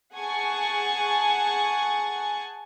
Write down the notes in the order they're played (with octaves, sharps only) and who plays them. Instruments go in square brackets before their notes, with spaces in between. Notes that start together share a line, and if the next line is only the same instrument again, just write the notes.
[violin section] G#4 F#5 G#5 A5 C#6